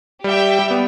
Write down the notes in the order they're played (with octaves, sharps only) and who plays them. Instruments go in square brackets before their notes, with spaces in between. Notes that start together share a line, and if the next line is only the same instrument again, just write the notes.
[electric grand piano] G3 [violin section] G4 E5 G5
[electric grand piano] G3
B3